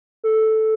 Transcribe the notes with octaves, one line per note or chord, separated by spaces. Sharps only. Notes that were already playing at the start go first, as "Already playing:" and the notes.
A4